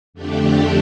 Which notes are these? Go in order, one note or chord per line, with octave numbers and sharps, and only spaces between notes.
F2 D3 A3 D4 G4